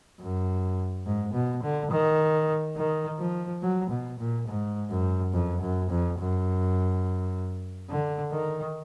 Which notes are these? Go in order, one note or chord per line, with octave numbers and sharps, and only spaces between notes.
F#2
G#2
B2
D3
D#3
D#3
F3
F#3
B2
A#2
G#2
F#2
F2
F#2
F2
F#2
D3
D#3